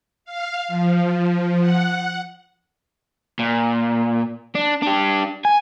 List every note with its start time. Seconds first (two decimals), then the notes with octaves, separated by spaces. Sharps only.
0.25 F5
0.68 F3
1.60 F#5
3.39 A#2
4.55 D4
4.83 D4 G4
5.45 G#5